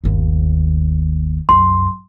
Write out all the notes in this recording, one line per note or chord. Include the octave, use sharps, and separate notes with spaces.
G1 D#2
C2 F#2 C6